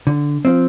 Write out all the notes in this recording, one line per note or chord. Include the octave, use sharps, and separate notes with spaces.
D3
F3 C4